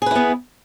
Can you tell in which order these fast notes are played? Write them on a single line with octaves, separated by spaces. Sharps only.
G#4 B4 E4 B3